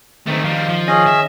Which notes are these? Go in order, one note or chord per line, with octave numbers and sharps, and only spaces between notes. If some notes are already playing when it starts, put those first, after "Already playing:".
D#3 E3 A3 C4
F3 G3 F5
F3
C#4 G#4 D#5
E5